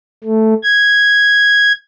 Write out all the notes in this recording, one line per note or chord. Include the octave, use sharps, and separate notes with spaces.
A3
G#6